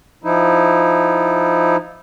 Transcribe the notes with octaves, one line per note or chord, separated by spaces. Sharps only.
F3 D#4 E4